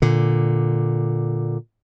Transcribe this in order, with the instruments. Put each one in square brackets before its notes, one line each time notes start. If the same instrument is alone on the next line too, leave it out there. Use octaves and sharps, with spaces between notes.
[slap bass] A#2 D3